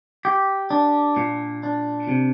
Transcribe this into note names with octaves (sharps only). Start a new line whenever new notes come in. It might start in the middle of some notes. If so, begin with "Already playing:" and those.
G4
D4
A#2
D4
C3